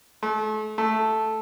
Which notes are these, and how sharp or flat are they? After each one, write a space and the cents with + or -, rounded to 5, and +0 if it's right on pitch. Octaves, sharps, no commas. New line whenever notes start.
A3 -35
A3 -5